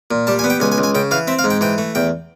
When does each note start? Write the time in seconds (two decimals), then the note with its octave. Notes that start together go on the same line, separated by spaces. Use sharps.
0.11 A#2
0.27 G3 A5
0.39 G#5
0.44 B3
0.50 G5
0.60 C#2 G#5
0.72 G#5
0.78 C#2
0.83 G#5
0.95 C#3 G5
1.11 E3 F5
1.27 C4 E5
1.39 F5
1.44 G#2
1.50 G5
1.61 E3 G5
1.78 A3
1.95 E2 G5